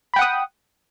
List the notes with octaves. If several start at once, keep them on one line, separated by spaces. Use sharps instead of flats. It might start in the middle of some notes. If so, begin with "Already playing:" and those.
F#5 G5 B5 D#6